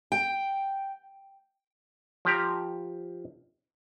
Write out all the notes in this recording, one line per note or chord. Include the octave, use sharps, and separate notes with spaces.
G5
F3 G4 A#5